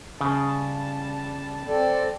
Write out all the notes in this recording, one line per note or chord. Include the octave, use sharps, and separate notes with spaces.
C#3 G3 A5
C4 A4 D5